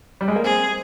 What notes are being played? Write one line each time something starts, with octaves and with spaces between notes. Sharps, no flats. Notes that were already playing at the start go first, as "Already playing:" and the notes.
G3
G#3
A#3
C4 G#4